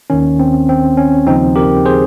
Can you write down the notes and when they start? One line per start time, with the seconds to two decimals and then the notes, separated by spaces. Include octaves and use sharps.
0.10 D#2 D#3 C#4
0.40 C4
0.69 C4
0.97 C#4
1.27 D#2 C#3 F3 C4 D#4
1.56 G4 A#4
1.85 G#4 C5